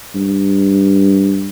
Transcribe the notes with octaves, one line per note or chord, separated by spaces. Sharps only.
G2